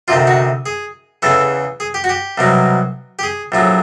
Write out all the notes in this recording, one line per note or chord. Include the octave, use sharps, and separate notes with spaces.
D2 C3 D#3 F4
F#4
G#4
E2 C#3 E3 A4
G#4
G4
F#4
G4
C2 B2 F#3
G4
G#4
A#1 A2 F#3